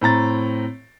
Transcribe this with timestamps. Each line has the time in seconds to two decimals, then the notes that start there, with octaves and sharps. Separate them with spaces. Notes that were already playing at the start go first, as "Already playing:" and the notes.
0.01 A2 C4 A#5 A6